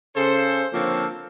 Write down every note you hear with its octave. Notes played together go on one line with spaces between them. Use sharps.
C#3 A4 C5
D3 F3 A#3 C4 A4 C#5